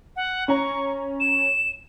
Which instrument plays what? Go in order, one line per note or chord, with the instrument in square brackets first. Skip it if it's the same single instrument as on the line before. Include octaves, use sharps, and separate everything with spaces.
[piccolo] F#5
[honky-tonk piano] C#4 A#5 [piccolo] C#6
[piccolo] E7